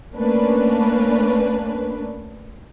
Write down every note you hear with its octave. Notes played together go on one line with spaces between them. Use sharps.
A3 A#3 C#4 D4 B4